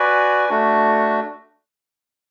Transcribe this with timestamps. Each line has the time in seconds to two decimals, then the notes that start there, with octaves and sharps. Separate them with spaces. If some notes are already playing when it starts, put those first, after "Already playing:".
Already playing: F#4 B4 D5 G#5
0.49 A3 D4 F#4